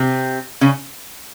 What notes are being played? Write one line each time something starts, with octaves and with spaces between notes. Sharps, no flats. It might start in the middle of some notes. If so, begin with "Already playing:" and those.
Already playing: C3 C4
C#3 C#4